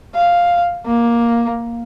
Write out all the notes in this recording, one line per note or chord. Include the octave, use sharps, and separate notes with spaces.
F5
A#3